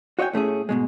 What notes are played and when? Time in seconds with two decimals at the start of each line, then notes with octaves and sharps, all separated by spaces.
0.19 F#4 C#5 D#5 E5 G5 G#5
0.33 A2 A3 C#4 G#4
0.69 G#2 B2 G#3